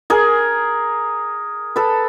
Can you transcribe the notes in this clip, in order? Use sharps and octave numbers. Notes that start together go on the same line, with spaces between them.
G#4 A#4
A4 B4